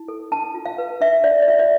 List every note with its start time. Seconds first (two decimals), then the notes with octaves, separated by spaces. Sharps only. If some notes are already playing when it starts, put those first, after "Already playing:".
Already playing: E4
0.08 A4
0.31 D4 A5
0.55 F4
0.66 F5
0.78 B4
1.01 D4 E5
1.24 D4 D5
1.42 D5
1.48 F4 E5
1.59 D5